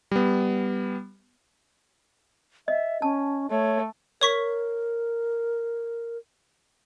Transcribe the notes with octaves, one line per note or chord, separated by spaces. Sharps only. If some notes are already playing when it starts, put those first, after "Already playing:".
G3 B3
D#5 E5
C#4 A5
A3 C#5
A#4 C#5 C#6 B6